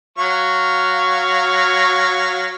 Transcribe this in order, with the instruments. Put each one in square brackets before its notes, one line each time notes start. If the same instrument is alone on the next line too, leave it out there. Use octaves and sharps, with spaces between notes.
[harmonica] F#3 F5 C#6